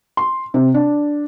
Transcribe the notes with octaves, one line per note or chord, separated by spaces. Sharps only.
C6
C3
D4